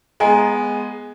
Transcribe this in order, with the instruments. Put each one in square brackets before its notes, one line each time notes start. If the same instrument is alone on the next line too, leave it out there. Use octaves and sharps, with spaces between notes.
[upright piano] G#3 B3 [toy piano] D#5 G#5 A#5